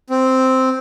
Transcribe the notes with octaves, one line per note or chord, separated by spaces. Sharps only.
C4